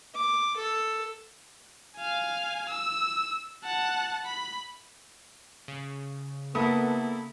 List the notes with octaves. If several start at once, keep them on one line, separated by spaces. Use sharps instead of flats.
D6
A4
F5 G#5
E6
F#5 A5
B5
C#3
A#3 B3 E4 A4 D#6